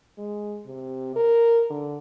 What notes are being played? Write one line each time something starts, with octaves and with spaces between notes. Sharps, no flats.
G#3
C3
A#4
D3